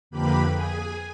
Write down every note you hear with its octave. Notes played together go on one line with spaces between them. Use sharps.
F2 D3 A#3 G4 B4 B5
G#4 G#5